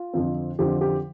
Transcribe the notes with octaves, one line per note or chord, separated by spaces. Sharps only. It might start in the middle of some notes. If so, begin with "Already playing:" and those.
Already playing: F4
F2 D3 F3 C4
F2 D3 F3 C4 G4
G4